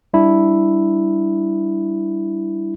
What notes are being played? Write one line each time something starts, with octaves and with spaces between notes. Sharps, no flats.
G3 D4 E4